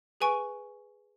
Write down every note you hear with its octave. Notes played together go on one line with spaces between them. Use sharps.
G#4 B4 G#5 C#6 D7